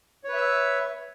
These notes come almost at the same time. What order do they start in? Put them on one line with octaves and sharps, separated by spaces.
C#5 B4 E5 E6